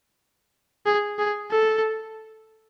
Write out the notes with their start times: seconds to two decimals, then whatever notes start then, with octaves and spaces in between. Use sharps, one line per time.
0.86 G#4
1.19 G#4
1.51 A4